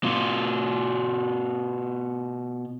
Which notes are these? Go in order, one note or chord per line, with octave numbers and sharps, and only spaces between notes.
B2 F4